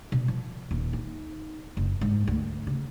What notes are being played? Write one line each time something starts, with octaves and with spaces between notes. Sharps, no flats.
B2
F3
D#1
D#4
F#1
G#2
D2
C#3